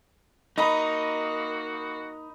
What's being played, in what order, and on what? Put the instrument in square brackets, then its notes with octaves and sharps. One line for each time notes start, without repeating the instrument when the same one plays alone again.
[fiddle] A#3 [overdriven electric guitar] D#4 [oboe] F#4 [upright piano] D#5 A#5 B5